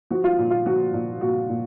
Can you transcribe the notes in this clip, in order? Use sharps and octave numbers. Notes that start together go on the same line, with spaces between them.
F3 F#4
F4
A#2
F4
F3 F#4
A#2
A#2 F#4
A#2